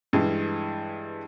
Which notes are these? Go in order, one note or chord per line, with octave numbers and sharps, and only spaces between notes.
G2 E3 G#3